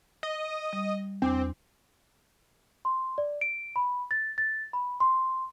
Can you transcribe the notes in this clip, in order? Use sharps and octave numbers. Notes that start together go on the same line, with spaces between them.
D#5
G3
E2 C4 D4 D6
C6
D5
D7
B5
A6
A6
B5
C6